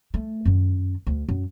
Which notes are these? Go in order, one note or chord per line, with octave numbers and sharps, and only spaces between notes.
A3
F#2 D#3
D2
F#2